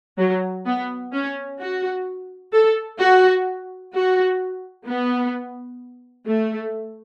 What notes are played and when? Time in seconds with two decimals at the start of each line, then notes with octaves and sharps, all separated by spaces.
0.18 F#3
0.66 B3
1.13 C#4
1.59 F#4
2.53 A4
2.99 F#4
3.94 F#4
4.87 B3
6.27 A3